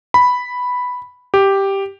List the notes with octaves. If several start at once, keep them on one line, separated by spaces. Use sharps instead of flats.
B5
G4